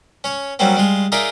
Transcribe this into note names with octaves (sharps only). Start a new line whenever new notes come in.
C#4 C#5
F#3 G3 A#3 C4 C#4
G3 G#3 F4
D#4 F4 G#4 A#4 D5 E5